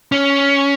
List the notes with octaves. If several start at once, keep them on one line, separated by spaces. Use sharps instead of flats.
C#4